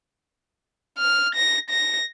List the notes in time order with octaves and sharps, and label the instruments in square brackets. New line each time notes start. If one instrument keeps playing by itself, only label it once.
[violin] F6
A#6
A#6